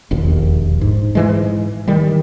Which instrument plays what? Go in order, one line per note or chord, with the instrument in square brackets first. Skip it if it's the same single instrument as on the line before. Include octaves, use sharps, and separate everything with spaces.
[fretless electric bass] E1 A#1 D#2
G#2
G#2 E3 G#3
D#3 G3